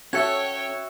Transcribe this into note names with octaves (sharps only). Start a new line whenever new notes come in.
C#4 F#4 A4 C#5 E5 G5 G#6 C#7